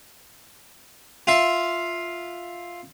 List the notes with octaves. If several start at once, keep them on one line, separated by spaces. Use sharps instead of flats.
F4 E5